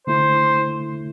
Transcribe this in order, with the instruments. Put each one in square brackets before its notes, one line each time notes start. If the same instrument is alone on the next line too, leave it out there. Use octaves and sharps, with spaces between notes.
[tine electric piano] D3 A3 E4 [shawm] C5